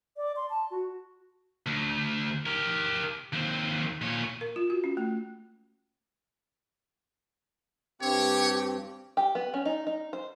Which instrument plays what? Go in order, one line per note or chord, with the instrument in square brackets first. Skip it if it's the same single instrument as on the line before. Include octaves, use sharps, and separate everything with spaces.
[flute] D5
C6
A5
F#4
[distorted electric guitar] D2
G4 A#4
D#2 C4
A#2 C#5
[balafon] A#4
F4
F#4
C#4
A3
[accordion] G2 C4 [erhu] G4 [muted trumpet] C#5
[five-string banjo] G4
B3
C#4
D#4
D#4
C5